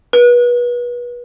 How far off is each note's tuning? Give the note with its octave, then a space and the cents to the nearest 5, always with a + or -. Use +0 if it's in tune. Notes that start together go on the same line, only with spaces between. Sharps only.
B4 -30